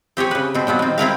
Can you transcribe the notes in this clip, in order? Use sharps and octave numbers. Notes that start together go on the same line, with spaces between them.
C4 G4 G#4 C#5
C#3 B4
B2 C4
A#2 F3 F#3 B3
D#3 C4
C4 E4 A#4 F5